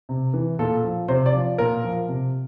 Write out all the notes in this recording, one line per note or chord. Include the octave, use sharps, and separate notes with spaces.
C3
E3
A#2 A4
F3
C3 C5
D5
F3
A#2 A#4
F3
C3